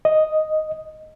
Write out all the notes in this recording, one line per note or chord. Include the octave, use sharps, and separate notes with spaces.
D#5